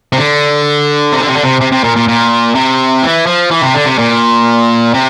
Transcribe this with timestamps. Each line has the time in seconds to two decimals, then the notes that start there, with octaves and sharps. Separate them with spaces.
0.13 C3
0.18 D3
1.13 C3
1.21 D3
1.27 C3
1.35 D3
1.43 C3
1.61 C3
1.72 C3
1.84 A#2
1.96 A#2
2.08 A#2
2.55 C3
3.03 E3
3.27 F3
3.51 E3
3.62 C3
3.74 D3
3.86 C3
3.98 A#2
4.94 C3